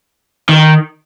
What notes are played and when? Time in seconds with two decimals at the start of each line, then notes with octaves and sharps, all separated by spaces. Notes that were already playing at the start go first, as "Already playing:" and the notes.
0.49 D#3